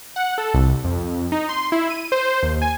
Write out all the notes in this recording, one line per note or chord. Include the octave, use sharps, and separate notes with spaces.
F#5
A4
C2
F2
D#4
C6
E4
D#7
C5
D#2
G#5